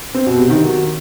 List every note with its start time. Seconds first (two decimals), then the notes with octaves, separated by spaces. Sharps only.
0.14 C4
0.26 B2
0.38 C3
0.50 D#3
0.62 F#3